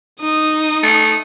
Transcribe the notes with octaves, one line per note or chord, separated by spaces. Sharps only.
D#4 D#6
A3